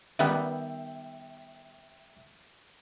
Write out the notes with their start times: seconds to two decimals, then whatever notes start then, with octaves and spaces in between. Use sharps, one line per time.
0.19 D#3 G3 B3 E5 G5